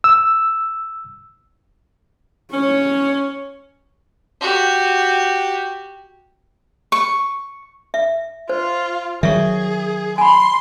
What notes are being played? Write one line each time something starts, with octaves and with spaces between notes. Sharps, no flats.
E6
C#4 C#5
F#4 G4
C#6
E5
F4 C5
D#3 F#3 G#4 E5 C#6
G#5 B5 C6